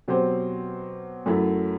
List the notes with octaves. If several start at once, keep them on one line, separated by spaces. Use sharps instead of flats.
B2 F#3 C4 G4 C5
F#2 F#3 A3 E4